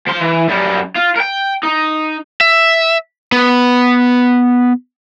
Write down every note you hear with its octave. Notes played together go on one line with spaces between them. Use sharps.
F3 C6
E3
F#2 G3
F4
A#4 G5
D#4
E5
B3